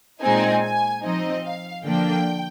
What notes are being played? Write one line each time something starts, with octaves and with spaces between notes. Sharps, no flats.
A#2 G#3 C4 D#4 G#5
G#5
F3 C4 D#4 D#5
F5
D3 F3 A#3 D4 G5